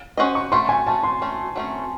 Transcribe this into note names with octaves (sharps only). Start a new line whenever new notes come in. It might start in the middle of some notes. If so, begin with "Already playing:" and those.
C#4 F#4 C5 D#5
C#6
F#3 A3 C#4 C6
G#5
F#3 A3 C#4 A5
C6
F#3 A3 C#4
F#3 A3 C#4